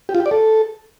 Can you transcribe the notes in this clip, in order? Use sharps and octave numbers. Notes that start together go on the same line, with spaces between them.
G4
F4
G4
D5
A4